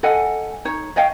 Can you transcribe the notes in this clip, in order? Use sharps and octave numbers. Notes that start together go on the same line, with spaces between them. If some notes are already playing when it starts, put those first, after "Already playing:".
A4 D#5 F#5 G#5
D#4 C#5
C#5 D#5 F5 G5